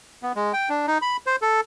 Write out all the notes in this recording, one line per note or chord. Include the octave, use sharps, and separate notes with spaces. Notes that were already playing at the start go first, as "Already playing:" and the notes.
B3
G#3
G5
D4
D#4
B5
C5
A4